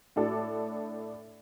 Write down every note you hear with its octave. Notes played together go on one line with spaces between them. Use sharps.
A2 D4 A4 D5